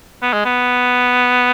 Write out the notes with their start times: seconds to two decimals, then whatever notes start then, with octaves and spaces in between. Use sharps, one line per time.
0.23 B3
0.33 G#3
0.45 B3